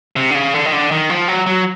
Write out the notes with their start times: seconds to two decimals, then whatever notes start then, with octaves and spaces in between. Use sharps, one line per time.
0.16 C3
0.31 D3
0.35 C#3
0.54 D3
0.66 D#3
0.72 D3
0.91 D#3
1.10 F3
1.28 F#3
1.46 F#3